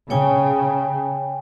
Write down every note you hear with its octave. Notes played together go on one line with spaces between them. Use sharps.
C#3 C#5 G5 G#5